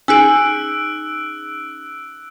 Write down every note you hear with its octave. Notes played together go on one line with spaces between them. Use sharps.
C#4 D#4 G#4 G#5 E6 F#6 D7